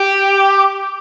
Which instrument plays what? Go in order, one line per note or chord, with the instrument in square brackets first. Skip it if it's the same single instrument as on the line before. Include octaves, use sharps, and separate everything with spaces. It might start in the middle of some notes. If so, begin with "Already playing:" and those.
Already playing: [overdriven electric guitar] G4